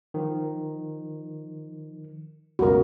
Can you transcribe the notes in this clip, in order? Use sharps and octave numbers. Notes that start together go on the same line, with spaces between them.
D#3 F3
C#2 F#2 B2 F#4 A#4